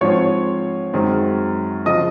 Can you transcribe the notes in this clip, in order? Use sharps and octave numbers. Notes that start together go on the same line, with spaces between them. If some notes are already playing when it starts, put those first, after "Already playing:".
G#2 F3 C4 C#5 C#6
F#2 D#3 G#3 C4
C#3 F3 D#5 D#6